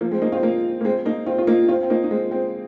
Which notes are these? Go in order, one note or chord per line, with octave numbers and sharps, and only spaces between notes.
F3 A#3
G#3 C4
A#3 D#4
C4 F4
A#3 D#4
A#3
G#3 C4
A#3 D#4
C4 F4
F4
A#3 D#4
C4 F4
C4
A#3 D#4
D#4
G#3 C4
G#3 C4